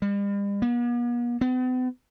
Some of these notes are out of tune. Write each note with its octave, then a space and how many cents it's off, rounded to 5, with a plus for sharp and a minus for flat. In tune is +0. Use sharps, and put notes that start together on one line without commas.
G3 +45
B3 -45
B3 +45